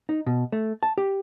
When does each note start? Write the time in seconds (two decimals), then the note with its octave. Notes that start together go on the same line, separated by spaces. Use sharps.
0.09 D#4
0.26 B2
0.52 A3
0.83 A5
0.98 G4